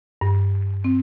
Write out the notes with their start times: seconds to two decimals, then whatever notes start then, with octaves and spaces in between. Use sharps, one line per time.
0.21 G2
0.84 C4